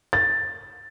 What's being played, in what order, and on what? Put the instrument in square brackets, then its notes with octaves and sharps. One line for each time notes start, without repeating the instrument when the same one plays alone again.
[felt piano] A6